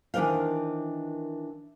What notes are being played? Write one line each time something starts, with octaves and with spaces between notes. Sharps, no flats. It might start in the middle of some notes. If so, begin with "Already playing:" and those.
D#3 E3 D4 A#4 C5 F5